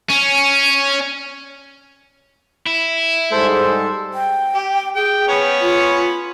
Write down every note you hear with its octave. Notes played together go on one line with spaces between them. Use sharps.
C#4
E4
G#2 G3 G#3 A4 C5
G5
G4
G#4 G5
B3 C#4 C#5
F4